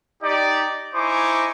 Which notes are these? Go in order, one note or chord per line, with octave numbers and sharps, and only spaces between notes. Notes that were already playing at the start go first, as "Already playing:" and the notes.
D#4 G4 D5
D#4 E4 C5 G#5 C#6 D6